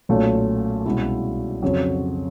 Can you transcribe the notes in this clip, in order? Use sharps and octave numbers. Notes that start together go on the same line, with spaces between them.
B1 A#2 F#3 A3 C#4
C2 B2 G#3 C#4 E4
F2 C#3 F#3